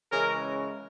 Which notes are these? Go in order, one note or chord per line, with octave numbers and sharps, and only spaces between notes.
C#3 E3 G#3 C#4 G#4 A#4